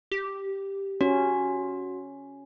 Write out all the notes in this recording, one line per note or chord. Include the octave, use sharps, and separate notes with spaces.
G4
C#4 F#4